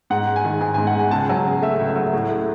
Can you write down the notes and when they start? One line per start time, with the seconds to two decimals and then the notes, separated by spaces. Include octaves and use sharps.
0.10 G#2 F#5
0.27 G#3
0.36 G#5
0.45 D#3
0.61 G#2 G#5
0.74 G#5
0.78 G#2
0.87 F#5
0.94 G#3 G#5
1.11 C#2 A5
1.29 F#3 G#5
1.46 C#3
1.62 A3 E5
1.80 C#2
1.88 E5
1.96 F#3
2.13 A2
2.30 A3